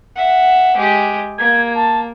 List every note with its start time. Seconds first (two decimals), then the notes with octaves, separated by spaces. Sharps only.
0.16 E5 F#5
0.77 G#3 G4
1.38 A#3 G#6
1.75 A5